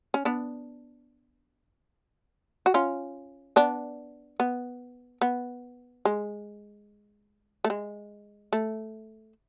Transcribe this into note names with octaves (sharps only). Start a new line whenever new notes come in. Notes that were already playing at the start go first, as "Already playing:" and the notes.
C#4
B3 D4
F#4
C#4 F4
B3 D4
B3
B3
G#3
A3
G#3
A3